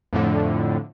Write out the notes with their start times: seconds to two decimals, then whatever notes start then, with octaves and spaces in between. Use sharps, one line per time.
0.13 F2 A2 D3